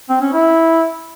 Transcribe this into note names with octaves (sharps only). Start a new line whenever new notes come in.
C4
C#4
E4